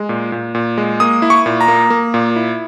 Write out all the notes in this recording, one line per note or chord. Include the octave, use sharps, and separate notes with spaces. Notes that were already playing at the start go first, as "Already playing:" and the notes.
Already playing: G#3
A#2
A#2
A#2
G#3
A#3 D#6
E4
C#6
A#2
A#5
A#3
A#3
A#2
E4